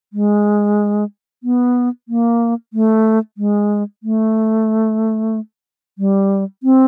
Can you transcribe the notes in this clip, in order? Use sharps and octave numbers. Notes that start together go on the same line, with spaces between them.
G#3
B3
A#3
A3
G#3
A3
G3
C4